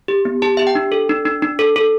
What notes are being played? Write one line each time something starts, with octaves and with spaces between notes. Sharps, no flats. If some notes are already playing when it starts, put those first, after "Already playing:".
G4
B3
G4 A5
G4 E5
G5
D4
A4
D4
D4
D4
A4
A4